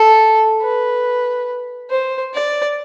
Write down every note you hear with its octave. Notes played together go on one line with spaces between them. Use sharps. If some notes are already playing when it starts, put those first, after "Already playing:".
Already playing: A4
B4
C5
D5